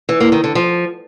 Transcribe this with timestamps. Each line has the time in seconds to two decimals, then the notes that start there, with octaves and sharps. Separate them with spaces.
0.09 E3
0.20 A#3
0.32 D#3
0.44 D3
0.55 F3